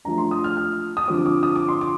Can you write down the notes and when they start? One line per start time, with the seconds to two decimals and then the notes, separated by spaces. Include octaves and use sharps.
0.05 F3 A3 D4 A#5
0.18 C6
0.31 D#6
0.44 F6
0.57 F6
0.97 D#6
1.08 D3 F3 C4 D6
1.26 D6
1.43 D#6
1.56 D6
1.69 C6
1.81 D6